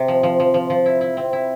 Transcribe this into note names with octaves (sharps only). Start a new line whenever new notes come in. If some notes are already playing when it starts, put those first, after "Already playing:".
Already playing: C3
F3
F3
F3
F3
F3
E4
E4
C4
E4